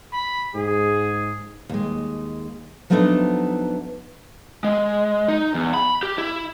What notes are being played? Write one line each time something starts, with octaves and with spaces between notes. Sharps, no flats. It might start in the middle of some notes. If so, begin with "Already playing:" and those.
B5
G#2 G#4
D#2 G#3
F3 F#3 A3 B3 D4 D#4
G#3
D#4
E2
B5
G4
E4